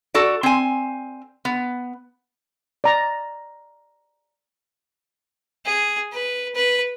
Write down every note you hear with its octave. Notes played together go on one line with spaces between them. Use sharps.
F#4 A4 D5
C4 G#5
B3
D5 A#5
G#4
B4
B4